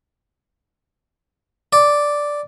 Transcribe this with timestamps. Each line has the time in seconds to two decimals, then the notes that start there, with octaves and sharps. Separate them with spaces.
1.73 D5